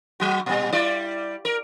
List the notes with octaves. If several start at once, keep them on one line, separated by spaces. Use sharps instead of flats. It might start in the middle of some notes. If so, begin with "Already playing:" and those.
F#3 F#4
A#2 G3
G3 E4 D5
A#4